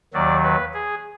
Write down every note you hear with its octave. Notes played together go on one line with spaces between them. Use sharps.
D#2 D#3 F#3 D5
B4
G#4